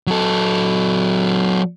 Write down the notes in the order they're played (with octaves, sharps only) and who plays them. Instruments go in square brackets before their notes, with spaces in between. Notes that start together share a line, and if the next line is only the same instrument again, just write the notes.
[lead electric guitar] F#3 A4